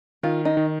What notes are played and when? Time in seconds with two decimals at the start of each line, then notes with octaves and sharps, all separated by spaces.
0.23 D#3 F4
0.45 D#4
0.57 D#3